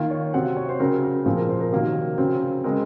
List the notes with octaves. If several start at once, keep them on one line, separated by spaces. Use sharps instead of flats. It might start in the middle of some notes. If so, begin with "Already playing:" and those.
Already playing: D#3 A#3 F4
C#5
C3 F#3 C4 F#5
C#5
C5
C#3 F#3 C4 A#4
A#4
A#2 F3 C4 G#4
A#4
C5
A#4
C3 D#3 F#3 A#3
C#3 F#3 C4
C#3 G#3 C4 A#4